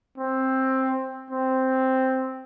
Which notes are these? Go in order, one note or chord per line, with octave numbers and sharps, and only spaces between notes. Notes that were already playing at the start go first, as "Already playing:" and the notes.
C4
C4